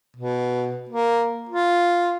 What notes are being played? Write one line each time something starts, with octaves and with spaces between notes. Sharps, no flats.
B2
A#3
F4